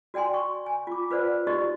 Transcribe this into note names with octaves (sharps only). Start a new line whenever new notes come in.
F#4 D5 G5 G#5 C6
C#6
G#5
F4 D6
F4 B4 C5 D5 F#5
D#4 F#4 G4 D5 D#5 C#6